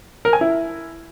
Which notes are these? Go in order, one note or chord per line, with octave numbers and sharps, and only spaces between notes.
A#4
G#5
E4